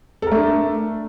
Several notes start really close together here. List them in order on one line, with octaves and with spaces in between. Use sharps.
A4 A#4 A3 D4